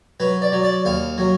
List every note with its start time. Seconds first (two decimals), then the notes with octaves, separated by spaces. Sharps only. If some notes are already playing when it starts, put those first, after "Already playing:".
0.20 F#3 B4
0.42 D5
0.52 F#3
0.63 D5
0.85 D#2 F5
1.18 F#3